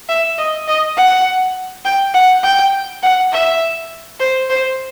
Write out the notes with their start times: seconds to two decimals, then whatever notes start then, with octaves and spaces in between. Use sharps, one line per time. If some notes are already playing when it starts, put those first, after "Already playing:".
0.09 E5
0.38 D#5
0.68 D#5
0.97 F#5
1.85 G5
2.14 F#5
2.43 G5
3.03 F#5
3.32 E5
4.20 C5
4.50 C5